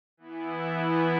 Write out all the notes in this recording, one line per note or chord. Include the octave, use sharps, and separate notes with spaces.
E3 B3 E4